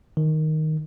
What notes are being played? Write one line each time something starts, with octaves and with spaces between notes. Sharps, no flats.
D#3